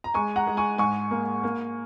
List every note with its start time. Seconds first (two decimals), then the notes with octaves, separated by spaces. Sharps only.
0.04 A#5
0.14 G#3 G#5 C#6
0.36 F#5 A#5
0.47 G#3
0.57 G#5 C#6
0.78 G#2 G#5 C#6
1.11 A#3
1.44 A#3